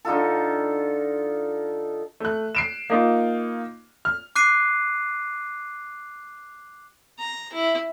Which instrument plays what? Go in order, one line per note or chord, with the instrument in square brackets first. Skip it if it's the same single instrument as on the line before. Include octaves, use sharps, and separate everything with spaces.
[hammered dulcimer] D3 D#4 F4 A4
[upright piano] A3 F#6
C7 D7 E7
A#3 D#4 F4
F6
[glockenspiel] D6 F#6 C7 D#7
[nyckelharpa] A#5
E4